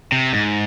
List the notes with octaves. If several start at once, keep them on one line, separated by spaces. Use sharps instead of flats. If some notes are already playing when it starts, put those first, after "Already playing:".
C3
G#2